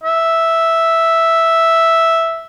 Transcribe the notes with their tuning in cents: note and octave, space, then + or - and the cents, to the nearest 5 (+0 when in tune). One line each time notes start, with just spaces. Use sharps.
E5 -5